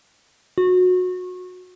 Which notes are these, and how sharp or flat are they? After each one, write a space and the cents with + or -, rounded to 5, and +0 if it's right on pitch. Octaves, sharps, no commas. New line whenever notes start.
F#4 -25